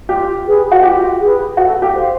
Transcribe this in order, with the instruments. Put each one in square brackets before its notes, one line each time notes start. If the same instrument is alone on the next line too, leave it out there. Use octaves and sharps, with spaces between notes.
[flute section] F4 [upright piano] G4
[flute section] G#4 B4
[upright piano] F#4
[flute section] F4 [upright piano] G4
[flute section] G#4 B4
[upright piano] F#4 [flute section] A4
[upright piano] G4
[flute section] C5 F5